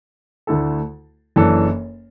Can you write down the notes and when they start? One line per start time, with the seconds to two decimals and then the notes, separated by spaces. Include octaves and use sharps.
0.47 D2 D3 A3 E4 A4
1.36 F#1 F#2 E3 D4 A4